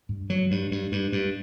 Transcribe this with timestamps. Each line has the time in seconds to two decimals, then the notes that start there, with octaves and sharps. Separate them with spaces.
0.09 G2
0.30 F#3
0.51 G2
0.71 G2
0.92 G2
1.12 G2